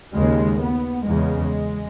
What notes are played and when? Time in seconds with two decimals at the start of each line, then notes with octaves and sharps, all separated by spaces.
0.13 D#2 C#3 G#3
0.60 B3
1.06 E2 C#3 G#3